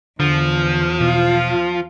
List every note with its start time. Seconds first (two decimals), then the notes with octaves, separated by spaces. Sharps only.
0.20 E2 D3 F3
1.01 B2 F4